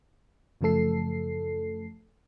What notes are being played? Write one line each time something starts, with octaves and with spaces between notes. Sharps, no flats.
F#2 C#3 F3 A3 A4 C7